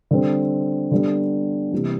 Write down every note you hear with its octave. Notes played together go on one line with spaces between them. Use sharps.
D3 G3 C4
D3 G3 B3
C3 E3 G3 A#3